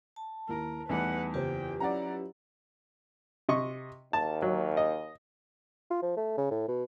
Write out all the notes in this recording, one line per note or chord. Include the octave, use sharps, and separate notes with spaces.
A5
D#2 E4 A#4 A#5
E2 E3 G3 A3 D#4 B4 F#5
F#1 F4 G4 B4 C5 G5
F#3 C#4 E4 D5 F#5 A#5
C3 D#5 C#6
D#2 A5
F#3
D#5
F4
F3
A3
C#3
A2
B2